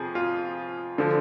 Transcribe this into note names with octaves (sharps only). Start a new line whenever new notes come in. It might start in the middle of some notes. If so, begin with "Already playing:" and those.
Already playing: F2 C3 F3 G#4
F4
D3 F3